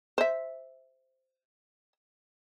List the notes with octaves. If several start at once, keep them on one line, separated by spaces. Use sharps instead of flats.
C5 E5